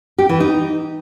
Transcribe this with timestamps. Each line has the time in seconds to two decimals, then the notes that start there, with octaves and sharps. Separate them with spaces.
0.18 G4
0.29 E3
0.40 D#4